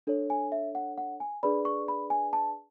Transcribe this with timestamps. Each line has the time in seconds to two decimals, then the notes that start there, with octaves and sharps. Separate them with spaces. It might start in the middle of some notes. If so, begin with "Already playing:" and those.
0.07 D4 A4 C#5
0.30 G#5
0.52 E5
0.75 F#5
0.98 F#5
1.20 G#5
1.43 D4 G#4 B4 D5 B5
1.65 C#6
1.88 B5
2.10 G#5
2.33 A5